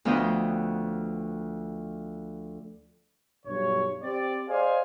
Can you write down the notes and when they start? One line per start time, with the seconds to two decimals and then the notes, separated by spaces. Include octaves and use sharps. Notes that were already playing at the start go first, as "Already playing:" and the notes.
0.05 D2 F3 B3 F4 D#5 G5
3.46 B1 G2 C#5
4.03 C4 G4 D5
4.48 G#4 C5 D5 D#5 F5 G#5